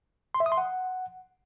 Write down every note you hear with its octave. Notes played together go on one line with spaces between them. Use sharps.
C6
E5
D#6
C6
F#5